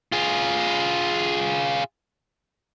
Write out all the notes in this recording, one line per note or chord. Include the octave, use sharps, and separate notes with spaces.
F4 G#4